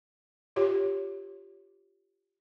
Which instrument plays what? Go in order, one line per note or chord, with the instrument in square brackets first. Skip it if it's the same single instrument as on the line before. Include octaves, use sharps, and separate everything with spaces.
[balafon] F4 G4 C#5